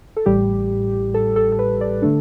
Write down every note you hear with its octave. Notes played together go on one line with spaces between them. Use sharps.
A4
A1 A2 G3 G4
A4
A4
A4
B4
D5
D3 A3 D4 A4